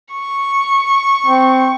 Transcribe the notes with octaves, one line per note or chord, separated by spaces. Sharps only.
C#6
C4